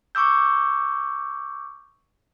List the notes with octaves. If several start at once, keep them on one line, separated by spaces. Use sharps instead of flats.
C#6 D6 E6 G6